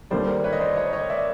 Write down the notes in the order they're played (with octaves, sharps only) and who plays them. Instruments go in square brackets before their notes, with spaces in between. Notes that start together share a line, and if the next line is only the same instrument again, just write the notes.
[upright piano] D#2 D3 G3 [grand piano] C5 D5
[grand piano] A#4 C5
B4 C#5
D#5
C5 D5
C#5 D#5
C#5 D#5
D5 E5